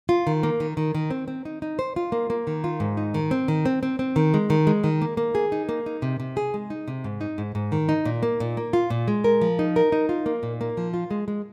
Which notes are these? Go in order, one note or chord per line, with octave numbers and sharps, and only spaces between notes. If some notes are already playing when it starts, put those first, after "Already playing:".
F4
D#3
A#3
D#3
D#3
D#3
C4
C4
D#4
D#4
C5
F4
A#3
A#3
D#3
F4
G#2
D#4
D#3
C4
D#3
C4
C4
C4
D#3
G#3
D#3
G#3
D#3
A#3
A#3
G#4
D#4
A#3
D#4
C3
C3
G#4
G#3
D#4
C3
G#2
D#4
G#2
G#2
D#3
D#4
A#2
A#3
A#2
A#3
F4
A#2
G#3
A#4
F3
D#4
A#4
D#4
F4
A#3
A#2
A#3
F3
F4
G#3
G#3